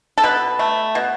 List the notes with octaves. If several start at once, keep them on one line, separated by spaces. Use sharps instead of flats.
A4
B2 B4
A3
B2